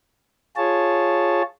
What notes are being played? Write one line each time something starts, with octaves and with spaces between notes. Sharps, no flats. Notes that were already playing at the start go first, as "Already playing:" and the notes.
F4 G#4 C#5 A5